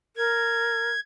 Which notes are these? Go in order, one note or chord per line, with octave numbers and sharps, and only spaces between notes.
A#4 G#6